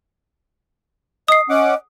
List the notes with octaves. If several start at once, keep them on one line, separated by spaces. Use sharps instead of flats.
D#5 D#6 C7
C#4 D#5 F#5 D6